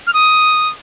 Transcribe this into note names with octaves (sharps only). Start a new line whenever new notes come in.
F6
D#6